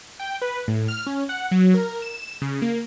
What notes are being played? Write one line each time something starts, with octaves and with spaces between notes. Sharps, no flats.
G5
B4
A2
F6
C#4
F#5
F#3
A#4
E7
C#3
A#3